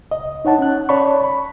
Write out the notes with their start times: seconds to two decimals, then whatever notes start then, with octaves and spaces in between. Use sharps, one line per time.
0.11 C#2 D#5
0.45 D#4 C#5 F#5 A5
0.59 C#4 F#6
0.89 C#5 D5 A5 B5 C#6
1.24 B5